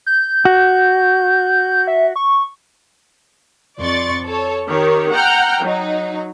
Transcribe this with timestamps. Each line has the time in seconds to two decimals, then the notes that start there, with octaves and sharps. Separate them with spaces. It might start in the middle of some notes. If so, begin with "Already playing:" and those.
0.06 G6
0.45 F#4
1.87 E5
2.16 C#6
3.80 F2 D5 C6 C#6 A6
4.27 A4 C#5
4.69 D#3 G4 C#5
5.12 F#5 G5 A#5 F6 G6
5.62 F#3 D#4